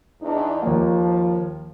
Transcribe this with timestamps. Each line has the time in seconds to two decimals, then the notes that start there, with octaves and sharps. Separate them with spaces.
0.22 E2 D4 D#4
0.62 D#2 F3 A#3